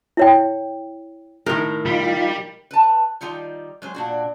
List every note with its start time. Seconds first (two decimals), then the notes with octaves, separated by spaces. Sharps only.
0.17 E4 C#5 G5
1.46 A2 D#3 A#4
1.86 G3 D#4 F4 B5
2.71 B4 A5
3.21 D#3 G3 D#4 F4 G5
3.82 F#3 G#3 C5
3.94 A#2 D4 F#4